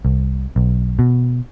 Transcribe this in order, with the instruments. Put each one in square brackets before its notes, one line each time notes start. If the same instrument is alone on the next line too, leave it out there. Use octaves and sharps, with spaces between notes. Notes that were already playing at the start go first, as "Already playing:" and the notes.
[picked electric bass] C2
B1
B2